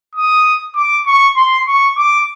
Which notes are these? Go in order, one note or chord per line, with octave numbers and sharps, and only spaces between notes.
D#6
D6
C#6
C6
C#6
D6